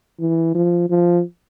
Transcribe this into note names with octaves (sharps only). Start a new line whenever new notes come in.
E3
F3
F3